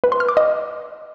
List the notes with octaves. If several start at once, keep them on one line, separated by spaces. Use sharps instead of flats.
B4
C6
F6
D6
D#5